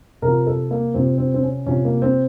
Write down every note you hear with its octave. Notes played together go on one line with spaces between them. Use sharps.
C3 A#4
F3
A4
A#3
C3 F3 C4
C4
C4
C#4
C3 F3 C#4
A#3
C4